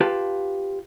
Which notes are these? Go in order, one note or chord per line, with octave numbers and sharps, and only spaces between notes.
F4 G4 B4 F5 A5